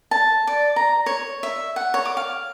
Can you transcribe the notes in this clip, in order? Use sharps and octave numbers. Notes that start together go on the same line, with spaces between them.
A5
D5
A#5
C#5
E5
F#5
C#5
D6
F5